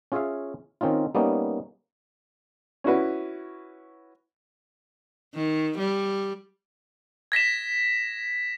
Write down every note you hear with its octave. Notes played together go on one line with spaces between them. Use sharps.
C#4 F4 G#4 C#5 E5 F5
D#3 C4 C#4 D#4 F4
G3 A#3 B3 C#4 D#4
C#4 E4 F#4 B4
D#3
G3
G#6 A#6 B6 E7